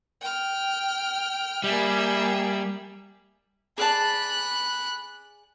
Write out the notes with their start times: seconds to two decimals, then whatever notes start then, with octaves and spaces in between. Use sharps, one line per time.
0.20 G5 F6
1.64 G3 A#3 G#4 E5
3.78 G#4 D5 A5 B5 F#6